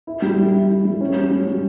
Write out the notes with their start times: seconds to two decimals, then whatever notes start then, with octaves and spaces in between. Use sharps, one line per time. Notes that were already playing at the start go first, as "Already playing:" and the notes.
0.07 E4
0.22 G3
0.38 G3
0.53 E4
0.69 E4
0.85 G3
1.01 C#4
1.16 G3
1.31 G3
1.47 G3